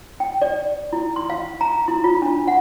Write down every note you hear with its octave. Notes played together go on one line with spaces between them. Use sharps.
G5
D5
E4
C6
F5
A#5
E4
F4
D4
F#5